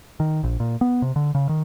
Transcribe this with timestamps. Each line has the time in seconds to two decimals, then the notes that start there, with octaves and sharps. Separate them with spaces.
0.20 D#3
0.43 A#1
0.60 A#2
0.81 B3
1.02 C3
1.16 D3
1.35 C#3
1.49 D#3